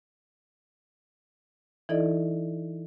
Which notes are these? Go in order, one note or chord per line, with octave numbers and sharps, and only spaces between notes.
E3 D#4 E4 A4 D5 D#5